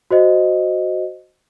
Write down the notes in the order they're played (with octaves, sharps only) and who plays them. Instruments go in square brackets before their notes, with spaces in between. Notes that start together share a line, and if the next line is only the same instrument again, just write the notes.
[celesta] F#4 C5 D#5